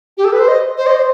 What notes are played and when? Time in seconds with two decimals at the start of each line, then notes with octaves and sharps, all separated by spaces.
0.17 G4
0.25 A4
0.32 B4
0.39 C5
0.48 D#5
0.77 C5
0.87 D#5
0.96 C5